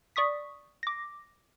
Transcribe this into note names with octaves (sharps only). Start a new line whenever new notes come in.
D5 C#6 D#6 B6
D6 A#6